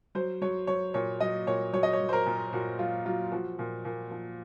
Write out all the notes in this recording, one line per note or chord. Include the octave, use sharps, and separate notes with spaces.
F#3 C5
F#3 C#5
F#3 C#5
A#2 C#5
F#3 D#5
A#2 C#5
F#3 C#5
D#5
C#5
F#3
C5
A#4
A#2
A#2 F#4
F#3 F4
F#3 F4
F3 F#4
A#2
A#2
F3